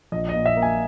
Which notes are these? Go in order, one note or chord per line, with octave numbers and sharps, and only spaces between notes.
A#1 D#5
D#5
A#2
E5
A#3
G#5